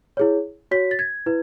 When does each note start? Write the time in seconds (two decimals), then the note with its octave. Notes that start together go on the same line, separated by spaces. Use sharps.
0.17 E4 G#4 C#5
0.71 F#4 C#5 B6
0.91 A6
0.99 G#6
1.26 E4 B4